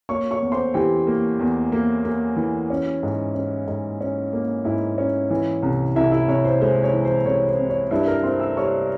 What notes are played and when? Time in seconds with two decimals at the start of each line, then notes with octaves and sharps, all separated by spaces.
0.09 A#3 C#5 C#6
0.31 C#5 C#6
0.42 E2
0.52 C5 C6
0.74 E3 G4 G5
1.07 A#3
1.40 E2
1.72 A#3
2.05 A#3
2.37 E3
2.70 C#4
3.03 G#2
3.35 C#4
3.67 G#2
4.01 C#4
4.33 A#3
4.65 G#2 E4 E5
4.98 C#4
5.30 E3
5.63 C2
5.96 C2 E4 E5
6.12 E4 E5
6.28 C2 C#5
6.45 C5
6.61 G#3 C5
6.83 C#5
6.93 E3
7.05 C5
7.25 C2 C#5
7.47 C5
7.58 C3
7.70 C#5
7.91 G2 E4 E5
8.07 A#4 A#5
8.23 C4 C5 C6
8.40 E5 E6
8.56 G3 C#5 C#6